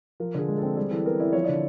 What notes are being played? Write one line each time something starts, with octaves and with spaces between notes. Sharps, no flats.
F3 A#4
D3 G#4
G#3
C4 A4
G3 G#4
E3 A4
B3 A#4
E4 D5
F3 C#5
D3 D5